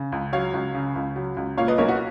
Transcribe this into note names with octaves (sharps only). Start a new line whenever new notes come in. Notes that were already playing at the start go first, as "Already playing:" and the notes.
Already playing: C#3
C#2
F#3 C#5 F5
C#2
C#3
C#2
F#3
C#2
A#2 C#5 F5
B4 D#5
B1 A#4 C#5
F#4